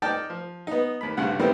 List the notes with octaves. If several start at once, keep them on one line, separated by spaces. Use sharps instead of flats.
D#4 D5 G5 A5 D6 F6
F3
B3 D#4
D#2 B5
B1 G2 C#3 F#5
D#3 G3 A3 B3 C4 E4